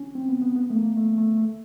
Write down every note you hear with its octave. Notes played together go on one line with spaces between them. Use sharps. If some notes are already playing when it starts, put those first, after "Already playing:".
Already playing: C#4
C4
B3
B3
B3
A3
A#3
A3
A3
A3